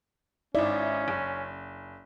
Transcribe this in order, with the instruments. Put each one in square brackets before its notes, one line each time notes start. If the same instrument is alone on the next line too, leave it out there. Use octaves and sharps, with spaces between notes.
[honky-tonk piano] G#1 D#4 E4 [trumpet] C#4 [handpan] D5
[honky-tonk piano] F#1